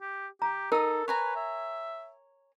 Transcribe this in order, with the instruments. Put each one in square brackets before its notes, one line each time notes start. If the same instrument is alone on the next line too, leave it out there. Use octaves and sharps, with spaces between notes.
[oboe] G4
[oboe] G4 [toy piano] A#5
[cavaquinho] D#4 D#6 [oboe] A4 [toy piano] A#4
[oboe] B4 [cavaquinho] C#5 G#5 A#5
[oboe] E5